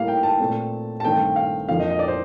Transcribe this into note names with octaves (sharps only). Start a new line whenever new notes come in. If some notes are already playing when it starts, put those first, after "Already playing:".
Already playing: A2 G3 A#3 F5
G5
A5
A#2 A3 C4
A5
G2 D#3 A3 C4 G5
F5
F2 D3 F3 A#3 F5
D#5
D#5
D5
C5